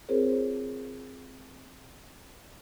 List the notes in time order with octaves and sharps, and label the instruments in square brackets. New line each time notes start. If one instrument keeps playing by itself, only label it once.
[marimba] C4 F4 G#4 A#4 C5 C#5